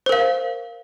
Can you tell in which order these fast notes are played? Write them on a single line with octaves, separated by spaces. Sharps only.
C5 A#4 F5